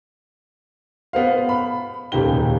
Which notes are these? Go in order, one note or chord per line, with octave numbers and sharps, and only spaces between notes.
B3 C5 F5
B5
D#1 C#2 D#3 G4 G7